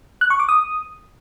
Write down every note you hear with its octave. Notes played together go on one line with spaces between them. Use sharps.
F#6
C#6
D6
D#6